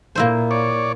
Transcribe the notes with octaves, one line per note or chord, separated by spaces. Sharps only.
A#2 A#3 E4 C5
C#5 D5